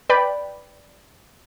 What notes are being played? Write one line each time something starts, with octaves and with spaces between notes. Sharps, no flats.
B4 D5 G5 B5